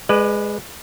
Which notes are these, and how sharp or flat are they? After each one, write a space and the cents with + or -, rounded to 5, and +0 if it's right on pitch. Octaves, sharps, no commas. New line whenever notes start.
G#3 +0 B4 +5 D5 +35